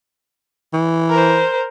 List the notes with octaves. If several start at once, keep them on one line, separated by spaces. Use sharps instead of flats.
E3
A#4 C5